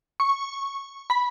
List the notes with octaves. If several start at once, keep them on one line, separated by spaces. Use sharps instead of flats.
C#6
B5